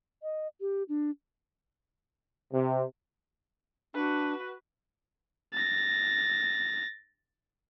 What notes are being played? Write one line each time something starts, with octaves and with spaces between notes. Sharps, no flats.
D#5
G4
D4
C3
D4 F#4 B4
A6 A#6